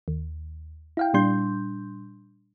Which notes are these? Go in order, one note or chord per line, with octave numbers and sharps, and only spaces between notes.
D#2
E4 F5 G5
A#2 G3 D4 C6 G6